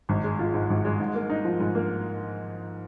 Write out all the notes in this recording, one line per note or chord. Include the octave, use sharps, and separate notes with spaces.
G#1
G#3
F4
G#2
G#1
G#3
G#2
A#3
D#4
F3
G#2
A#3